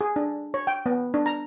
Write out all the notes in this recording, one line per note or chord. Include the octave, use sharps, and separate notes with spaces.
G#4
D4
C#5
G5
B3
D4
A#5